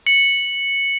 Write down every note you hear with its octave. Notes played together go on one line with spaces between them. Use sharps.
C#7 F#7